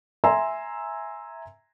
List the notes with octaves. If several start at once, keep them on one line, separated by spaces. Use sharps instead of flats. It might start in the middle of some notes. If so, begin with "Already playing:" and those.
E5 G#5 A#5 C6 E6